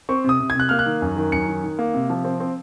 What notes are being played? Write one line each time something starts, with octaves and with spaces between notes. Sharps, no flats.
C4 C#6
C3 D#6
C3
G#6
C3 F#6
A#3 F6
F#6
D#3
F#2
D#3
F#2 C#7
D#3
D#3
A#3
C3
F3
C4
C4